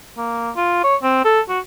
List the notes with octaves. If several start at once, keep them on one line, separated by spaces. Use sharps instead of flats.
A#3
F4
C#5
C4
A4
F#4